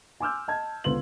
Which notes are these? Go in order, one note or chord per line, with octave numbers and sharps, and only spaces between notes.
G#5 C6 D6 E6 F6 G6
D#5 A5 G#6
C#2 D3 B3 B4 C6 F#7